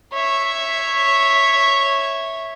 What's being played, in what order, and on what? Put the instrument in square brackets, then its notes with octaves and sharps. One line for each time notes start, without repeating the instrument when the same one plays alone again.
[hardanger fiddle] C#5 E5